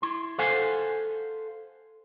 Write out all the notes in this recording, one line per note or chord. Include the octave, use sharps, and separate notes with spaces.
E4 C6
A4 C5 F5 F#5 G#5